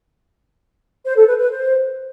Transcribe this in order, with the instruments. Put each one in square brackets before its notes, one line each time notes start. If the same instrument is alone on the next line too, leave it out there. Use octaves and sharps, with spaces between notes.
[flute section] C5
A4
B4
B4
C5